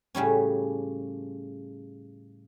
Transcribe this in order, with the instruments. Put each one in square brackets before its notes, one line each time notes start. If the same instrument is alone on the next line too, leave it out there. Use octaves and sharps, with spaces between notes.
[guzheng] A2 C#3 G3 C#4